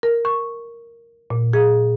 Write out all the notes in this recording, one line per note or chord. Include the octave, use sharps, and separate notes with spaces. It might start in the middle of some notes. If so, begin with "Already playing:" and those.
A#4
C#6
A#2
G#4